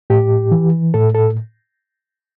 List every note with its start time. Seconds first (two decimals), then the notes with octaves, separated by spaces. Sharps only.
0.10 A2 G4
0.52 E3
0.94 A2 A4
1.15 A4